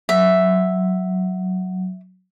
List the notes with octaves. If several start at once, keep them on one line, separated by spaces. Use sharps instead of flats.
F#3 E5